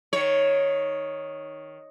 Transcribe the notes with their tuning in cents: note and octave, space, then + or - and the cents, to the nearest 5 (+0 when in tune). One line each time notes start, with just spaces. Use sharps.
D#3 +0 C#5 +0